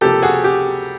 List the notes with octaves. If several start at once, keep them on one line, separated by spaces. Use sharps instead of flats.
C#2 C3 F3 A#3 G4 A4
F#4 G#4
G4